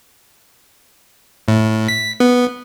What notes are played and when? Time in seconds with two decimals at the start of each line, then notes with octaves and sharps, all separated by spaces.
1.48 A2
1.88 B6
2.20 B3